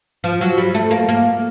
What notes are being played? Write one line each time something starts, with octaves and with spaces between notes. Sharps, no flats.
F3
F#3
G3
A3
A#3
A#3